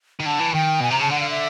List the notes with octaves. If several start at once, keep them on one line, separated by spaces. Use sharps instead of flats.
D#3
D3 A5
E3
D#3 G5
B2 G#5
C3 A#5
C#3 A5
D3 F#5
F5
E5